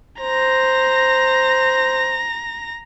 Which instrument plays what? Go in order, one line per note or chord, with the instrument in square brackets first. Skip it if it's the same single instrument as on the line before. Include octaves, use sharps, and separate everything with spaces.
[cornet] C5 [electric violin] A#5 A#6